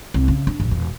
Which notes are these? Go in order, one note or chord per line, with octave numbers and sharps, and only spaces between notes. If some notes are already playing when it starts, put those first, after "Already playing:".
C2
C#3
D4
A#1
E1